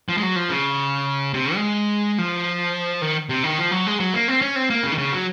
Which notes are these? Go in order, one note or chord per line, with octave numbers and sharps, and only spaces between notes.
F3
G#3
F#3
F3
C#3
C3
G#3
F3
D#3
C3
D#3
F3
F#3
G#3
F#3
A#3
C4
C#4
C4
A#3
C#3
D#3
C#3
F#3